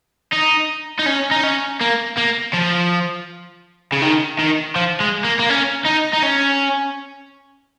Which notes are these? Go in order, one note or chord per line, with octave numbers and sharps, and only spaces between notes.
D#4
D#4
C#4
D#4
C#4
A#3
A#3
F3
C#3
D#3
D#3
F3
G#3
A#3
A#3
C#4
D#4
D#4
C#4